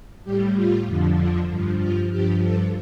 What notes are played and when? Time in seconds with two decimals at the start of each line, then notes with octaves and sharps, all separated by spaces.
0.24 A2 G3 G4
0.55 F4
0.86 F2 D3 F3
1.18 D4
1.49 G2 F3
1.80 F4
2.11 G2 F3 G4
2.43 A4